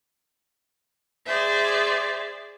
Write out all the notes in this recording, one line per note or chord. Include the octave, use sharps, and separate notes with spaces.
G#4 C5 D5 E5